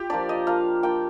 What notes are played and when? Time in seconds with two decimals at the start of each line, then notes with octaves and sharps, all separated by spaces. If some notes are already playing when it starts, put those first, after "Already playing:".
Already playing: F4 G4
0.10 F3 A#3 D4 D5
0.29 D#5
0.47 A#3 D4 F4 F5
0.83 A#3 D4 F4 G5